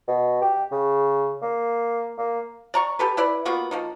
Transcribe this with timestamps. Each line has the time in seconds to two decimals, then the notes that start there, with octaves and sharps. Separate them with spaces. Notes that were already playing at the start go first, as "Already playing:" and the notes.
0.08 B2
0.42 G4
0.71 C#3
1.42 A#3
2.18 A#3
2.74 D5 A#5 C#6
2.99 G4 A4 B4
3.17 E4 B4 D5
3.45 A#3 B3 F4 F#4
3.71 F3 A#3 D#4